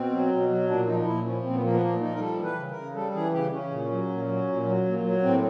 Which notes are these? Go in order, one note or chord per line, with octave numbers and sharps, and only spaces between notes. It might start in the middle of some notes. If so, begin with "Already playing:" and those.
Already playing: B2 C4
F#3
B2
F#3
A#2 D4
F3 D#4
D#4
A#2 E4
F3 C#4
A#2 C4
B3
F3 A#3
B3
A#2 A#3
F3 D#4
A#4
G3 A4
E3
B4
C#3
A#4
C#3
G3 A4
E3 G#4
C#3 G4
C#3 C#4
A#2
F#3
A#2
F#3
A#2
F#3
A#2
F#3
A2 C4